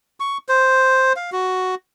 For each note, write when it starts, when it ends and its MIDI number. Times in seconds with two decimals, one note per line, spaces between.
0.20 0.38 85
0.49 1.13 72
1.16 1.30 77
1.32 1.75 66